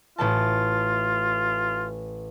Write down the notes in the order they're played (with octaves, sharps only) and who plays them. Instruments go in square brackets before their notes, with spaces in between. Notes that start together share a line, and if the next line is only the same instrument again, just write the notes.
[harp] A1 A4 A5 [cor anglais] F4